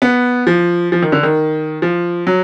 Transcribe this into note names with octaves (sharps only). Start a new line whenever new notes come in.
B3
F3
F3
D#3
D3
D#3
F3
F#3